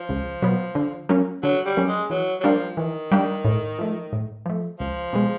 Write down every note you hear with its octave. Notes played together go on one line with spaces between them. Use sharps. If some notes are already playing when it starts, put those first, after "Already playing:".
Already playing: F3
C#2
B2 F#3 B3
D3
F#3 A#3 C#4
D3 F#3
G3
F#3 A#3 C#4
G#3
E3 F#3
F#3
F3 G3 A#3 D4 G4
D#3 E3
G3 A#3 D4 G4
A2
F3 A3
A2
F3 A3
C#2 F3
B2 G#3